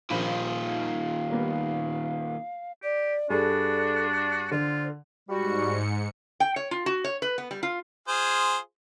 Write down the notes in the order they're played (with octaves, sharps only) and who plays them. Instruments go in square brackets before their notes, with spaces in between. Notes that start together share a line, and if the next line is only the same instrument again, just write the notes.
[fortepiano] A#1 F3 B5 [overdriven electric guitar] A#2 D#3 [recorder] F5
[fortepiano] G3 A#3 B3
[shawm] G4 [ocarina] D5
[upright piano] G2 G#4 [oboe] D4 [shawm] F#4 [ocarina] A4
[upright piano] D3 [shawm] F4 [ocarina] C5
[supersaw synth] G#2 C#7 [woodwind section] G3 F#4
[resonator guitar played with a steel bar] G5
C#5
F4
F#4
C#5
B4
B3
G3
F4
[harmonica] F4 G#4 C5